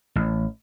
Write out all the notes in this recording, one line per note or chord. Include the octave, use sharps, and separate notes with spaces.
A1